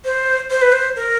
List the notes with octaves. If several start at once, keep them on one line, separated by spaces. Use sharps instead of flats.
C5
C5
B4
C5
A#4